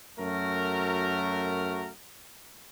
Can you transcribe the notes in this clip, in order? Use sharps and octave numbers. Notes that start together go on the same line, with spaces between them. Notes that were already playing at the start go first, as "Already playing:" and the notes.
F#2 A3 F#4 A#4